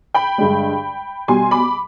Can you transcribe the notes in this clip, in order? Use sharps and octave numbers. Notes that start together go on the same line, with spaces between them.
G5 B5
G2 D3 G#3
B2 G3 G#5 C6
B5 D6